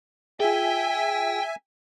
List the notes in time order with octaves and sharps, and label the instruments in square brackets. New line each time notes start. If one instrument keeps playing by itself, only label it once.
[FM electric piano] F4 G#4 [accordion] E5 G#5 [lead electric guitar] G5